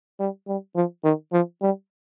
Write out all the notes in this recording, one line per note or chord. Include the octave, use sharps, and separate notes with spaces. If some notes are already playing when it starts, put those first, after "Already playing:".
G3
G3
F3
D#3
F3
G3